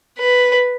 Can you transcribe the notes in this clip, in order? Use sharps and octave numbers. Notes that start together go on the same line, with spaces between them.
B4